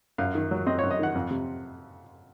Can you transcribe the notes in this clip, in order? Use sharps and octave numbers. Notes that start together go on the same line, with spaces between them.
F#2 F5
D#3
F#3
C4 D#5
F#2 C#5
D#5
D#3 F#5
F2
C3